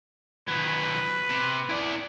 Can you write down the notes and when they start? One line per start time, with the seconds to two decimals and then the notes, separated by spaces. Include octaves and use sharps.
0.48 D#3 F#3 B4
1.30 C3
1.69 E4 D5